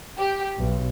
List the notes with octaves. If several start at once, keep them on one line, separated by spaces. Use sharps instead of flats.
G4
B1